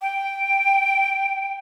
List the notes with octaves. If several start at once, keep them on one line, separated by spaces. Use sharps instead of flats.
G5